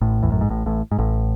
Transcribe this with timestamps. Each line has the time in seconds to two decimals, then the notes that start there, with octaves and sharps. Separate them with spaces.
0.01 A1 A2
0.23 E2
0.32 F#2
0.41 G#2
0.50 A1 A2
0.66 A1 A2
0.92 G#2
0.98 A1 A2